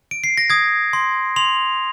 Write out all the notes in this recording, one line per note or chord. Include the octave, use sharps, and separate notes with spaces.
D7
C7
A#6
D#6 G#6
C6
C6 F7